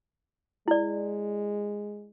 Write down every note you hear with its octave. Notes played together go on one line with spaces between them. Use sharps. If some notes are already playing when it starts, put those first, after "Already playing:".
G#3 E4 D5